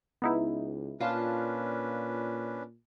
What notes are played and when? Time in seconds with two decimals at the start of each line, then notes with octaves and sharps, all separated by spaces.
0.22 C#2 B3 D#4 E4
1.01 A#2 C#4 D4 F4 B4 F5 A5